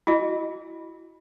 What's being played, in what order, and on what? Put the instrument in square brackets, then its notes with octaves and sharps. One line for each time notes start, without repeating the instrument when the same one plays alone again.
[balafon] E4 F#4 D#5